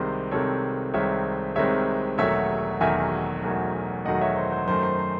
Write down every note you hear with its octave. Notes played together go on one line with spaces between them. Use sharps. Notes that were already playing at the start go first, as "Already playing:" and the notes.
Already playing: C2 C3 D#3 G#3 C4 C5
C2 C3 D#3 G#3 C4 A4 C#5
C2 C3 D#3 G#3 C4 C#5 E5
C2 C3 D#3 G#3 C4 C#5 E5
E1 E2 D#3 F#3 A3 C#5 E5
E1 E2 D#3 F#3 A3 E5 G#5
E1 E2 D#3 F#3 A3
E1 E2 D#3 F#3 A3 D#5 F#5
C#5 E5
C5
C5
F#2 D#3 A3 C5
C5
C5